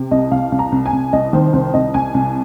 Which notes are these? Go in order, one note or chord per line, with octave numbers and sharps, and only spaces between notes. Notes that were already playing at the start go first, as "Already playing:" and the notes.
Already playing: C3
C2 D#5
C2 F5
C2
A#5
C2
G#5
C2
C2 D#5
D#3 C5
C2 C5
C2 D#5
C2 G#5
C2